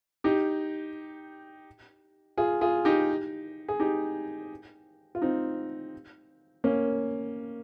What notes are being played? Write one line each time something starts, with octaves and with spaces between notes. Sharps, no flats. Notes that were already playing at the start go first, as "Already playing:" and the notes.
D#4 G4
F4 G#4
F4 G#4
D#4 G4
G#4
D#4 G4
F4
C4 D#4
A#3 C#4